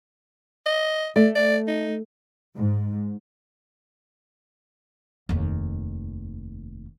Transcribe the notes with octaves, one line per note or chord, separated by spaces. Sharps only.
D#5
A3 D5
D5
D#4
G#2
F1 D#2